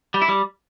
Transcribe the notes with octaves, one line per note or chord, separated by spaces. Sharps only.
G3
E4
G3